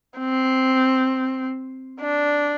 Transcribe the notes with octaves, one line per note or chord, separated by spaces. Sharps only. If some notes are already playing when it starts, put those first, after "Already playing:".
C4
D4